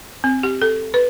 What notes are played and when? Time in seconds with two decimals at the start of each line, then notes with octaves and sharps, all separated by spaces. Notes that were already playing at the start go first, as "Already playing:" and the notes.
0.24 C4
0.43 G4
0.62 A4
0.94 B4